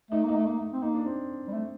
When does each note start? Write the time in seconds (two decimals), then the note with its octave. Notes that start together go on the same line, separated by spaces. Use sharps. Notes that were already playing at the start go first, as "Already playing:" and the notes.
0.11 A3 D#4
0.24 A#3
0.29 D#4
0.35 A3
0.46 A#3
0.59 A3
0.73 C4
0.82 A#3 D#4
0.94 D4
1.06 C4
1.48 G3
1.53 A3